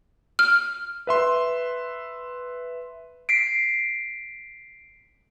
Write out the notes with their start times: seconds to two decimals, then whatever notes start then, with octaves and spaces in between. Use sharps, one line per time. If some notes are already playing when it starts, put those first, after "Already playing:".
0.39 F6
1.07 B4 E5 C6
3.29 B6 C7 D7